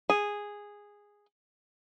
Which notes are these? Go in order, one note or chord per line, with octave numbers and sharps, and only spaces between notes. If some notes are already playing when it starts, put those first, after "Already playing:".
G#4